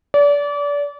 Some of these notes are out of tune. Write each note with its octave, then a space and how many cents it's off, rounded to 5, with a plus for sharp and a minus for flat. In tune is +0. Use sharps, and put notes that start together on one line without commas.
D5 -30